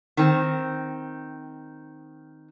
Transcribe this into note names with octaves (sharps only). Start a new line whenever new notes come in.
D#3 C4